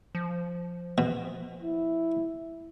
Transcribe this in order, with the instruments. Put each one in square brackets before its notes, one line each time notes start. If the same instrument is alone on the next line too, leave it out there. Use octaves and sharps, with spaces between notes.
[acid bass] F3
[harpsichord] B2
[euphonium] E4